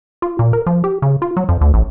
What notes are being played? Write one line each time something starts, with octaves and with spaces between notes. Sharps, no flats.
F4
A#2
A#4
F3
G4
C#3
F4
F#3
F2
D2
A1